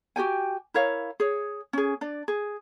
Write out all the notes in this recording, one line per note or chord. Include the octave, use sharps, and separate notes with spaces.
F#4 G4 G5 G#5
E4 A#4 C#5 F5
G#4 C#5
C#4 G#4
D4 D5
G#4